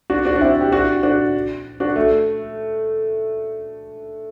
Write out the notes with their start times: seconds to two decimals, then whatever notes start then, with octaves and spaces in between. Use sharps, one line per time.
0.10 D4 F#4
0.25 D4 F#4
0.36 D4
0.41 C4 E4
0.61 G4
0.72 D4 F#4
1.03 D4 F#4
1.80 D4 F#4
1.96 A3